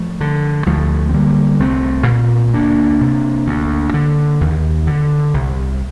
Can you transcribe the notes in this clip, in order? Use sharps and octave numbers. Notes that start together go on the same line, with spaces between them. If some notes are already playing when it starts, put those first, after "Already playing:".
Already playing: F3 A3
D3
D2 F3 A3
C4
D3 G3 A#3
C2 A3 C4
A#2
D2 A#3 D4
C3
D2
D3
D#2
D3
C2